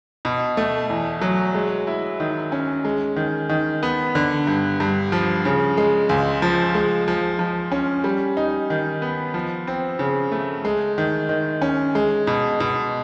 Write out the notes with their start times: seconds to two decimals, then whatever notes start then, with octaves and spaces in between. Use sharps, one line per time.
0.25 B2
0.57 A3
0.90 E2
1.21 F#3
1.55 G#3
1.87 E4
2.20 D#3
2.52 C#4
2.85 G#3
3.16 D#3
3.49 D#3
3.83 B3
4.15 D3
4.47 G2
4.80 G2
5.12 F3
5.45 C#3
5.77 G#3
6.09 C#2
6.42 F3
6.75 G#3
7.08 F3
7.39 F3
7.72 C#4
8.04 G3
8.37 D#4
8.70 D#3
9.02 B3
9.34 F3
9.67 C4
9.99 C#3
10.32 A3
10.65 G#3
10.98 D#3
11.29 D#3
11.62 C#4
11.95 G#3
12.27 B2
12.60 B2